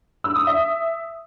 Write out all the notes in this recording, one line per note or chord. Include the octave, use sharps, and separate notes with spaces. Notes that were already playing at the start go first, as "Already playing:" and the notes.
E6
D#6
E5